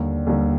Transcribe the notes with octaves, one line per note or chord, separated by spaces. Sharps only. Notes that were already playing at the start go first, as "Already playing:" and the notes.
Already playing: D#2 D3 G3
D#2 D3 G3